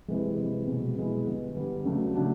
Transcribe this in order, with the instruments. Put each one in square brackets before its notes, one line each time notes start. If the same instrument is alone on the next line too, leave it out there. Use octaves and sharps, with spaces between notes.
[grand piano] C3 E3 G#3
C3 E3 G#3
B2 G#3 B3 E4
B2 G#3 B3 E4
D3 G3 B3
D3 G3 B3
C#3 F#3 A3 D4
C#3 F#3 A3 D4